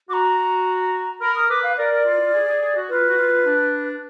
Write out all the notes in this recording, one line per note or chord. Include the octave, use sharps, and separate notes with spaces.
F#4 A#5 D6
A#4 B5
D#6
B4 D6
F5
A#4 D5
A#4
F4
F4
G#4
G#4
G#4
F#4
F4 B4
F#4
F4
D4